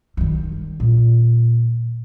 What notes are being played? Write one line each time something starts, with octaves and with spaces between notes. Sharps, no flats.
D#3 G3
A#2